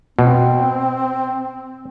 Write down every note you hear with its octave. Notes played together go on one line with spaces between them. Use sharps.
B2 C4